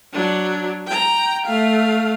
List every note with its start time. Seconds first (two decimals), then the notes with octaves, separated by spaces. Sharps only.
0.13 F#3 D4
0.86 G5 A#5
1.46 A3 F5